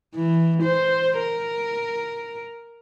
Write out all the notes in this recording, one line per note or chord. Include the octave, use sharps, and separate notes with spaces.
E3
C5
A#4